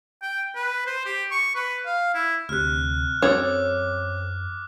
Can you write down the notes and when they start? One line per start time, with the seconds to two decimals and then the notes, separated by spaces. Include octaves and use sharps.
0.22 G5
0.55 B4
0.87 C5
1.05 G4
1.31 C#6
1.55 B4
1.86 F5
2.14 E4
2.49 D2 C3 F6 F#6
3.22 F#2 C4 A4 C#5 D6